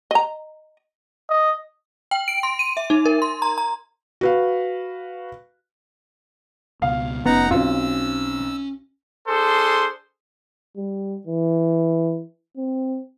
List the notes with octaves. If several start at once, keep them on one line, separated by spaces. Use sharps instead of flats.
D#5 A#5
D#5
G5
D7
C6
D#7
E5
D#4
A#4
C6
A#5
A#5
F#4 B4 F5
C#2 B2 F5
F1 F#2 B3 D#4 F#5 A#5
B1 C4 C#4 F4 E6
D4 G#4 A4 C5 C6
G3
E3
C4